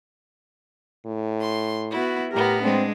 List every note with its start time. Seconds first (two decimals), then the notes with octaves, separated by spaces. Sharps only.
1.05 A2
1.41 C6
1.92 B3 E4 F#4
2.32 A2 B3 G4 A#4
2.63 G#3 C4 D4